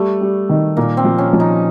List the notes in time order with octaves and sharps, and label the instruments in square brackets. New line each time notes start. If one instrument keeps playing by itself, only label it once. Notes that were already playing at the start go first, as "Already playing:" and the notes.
Already playing: [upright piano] G3 [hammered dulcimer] A3
[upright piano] G3
D#3
[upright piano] A#2 [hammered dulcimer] A#3
[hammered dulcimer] C4
[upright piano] F3
[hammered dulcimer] C#4
[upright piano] F3
[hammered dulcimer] D#4